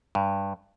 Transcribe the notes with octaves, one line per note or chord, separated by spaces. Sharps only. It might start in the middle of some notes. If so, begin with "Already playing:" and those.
G2